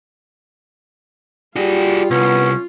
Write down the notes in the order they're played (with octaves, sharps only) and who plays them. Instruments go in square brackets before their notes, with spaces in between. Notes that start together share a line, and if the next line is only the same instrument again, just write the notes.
[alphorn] G3 [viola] F4 [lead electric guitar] F#4 G#4
[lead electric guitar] C2 [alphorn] B3 [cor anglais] C#4